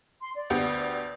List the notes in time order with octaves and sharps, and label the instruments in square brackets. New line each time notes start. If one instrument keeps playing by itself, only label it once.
[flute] C6
D5
[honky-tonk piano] D2 B3 G4